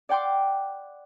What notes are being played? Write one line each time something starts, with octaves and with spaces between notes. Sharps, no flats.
D5 F#5 G5 C6 D6